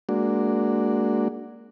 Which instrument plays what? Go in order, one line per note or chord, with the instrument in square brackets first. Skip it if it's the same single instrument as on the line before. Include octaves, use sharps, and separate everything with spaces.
[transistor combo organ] G#3 A#3 D4 F#4